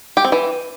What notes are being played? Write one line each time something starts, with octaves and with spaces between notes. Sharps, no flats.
G4
C4
E3